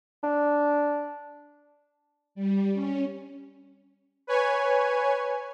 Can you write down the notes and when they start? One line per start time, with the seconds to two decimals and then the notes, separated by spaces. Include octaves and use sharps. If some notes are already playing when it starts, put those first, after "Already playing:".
0.23 D4
2.35 G3
2.73 C#4
4.27 B4 C#5 G#5